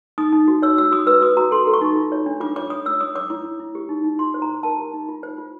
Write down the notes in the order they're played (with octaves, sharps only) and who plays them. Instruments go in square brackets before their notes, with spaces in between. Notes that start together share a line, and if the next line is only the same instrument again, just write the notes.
[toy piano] D#4 D#6
D#4
F#4
C#5 E6
F#4 E6
F#4 D#6
B4 E6
F#4 D#6
F#4 A#5
A4 C6
A4
C#6
D#4
F4
C#5
D4
F4 D6
C#5 D6
C#5 D#6
C#5 E6
C#5 D#6
C#5 D6
E4 D6
E4
E4
G4
D#4
D#4
F4 C6
C5
A#5
C5
A#4 A5
G4
D#4
F4
C5
F4